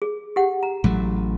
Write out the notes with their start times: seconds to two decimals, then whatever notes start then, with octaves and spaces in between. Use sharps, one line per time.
0.02 G#4
0.36 G4 F#5
0.63 A#5
0.84 A1 F#3 A3